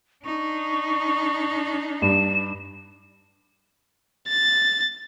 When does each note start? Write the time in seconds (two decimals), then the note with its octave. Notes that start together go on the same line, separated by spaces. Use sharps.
0.24 D4 D#4 C#6
2.02 G2 E7
4.29 A6